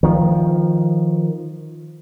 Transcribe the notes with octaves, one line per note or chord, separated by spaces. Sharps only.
D#3 F3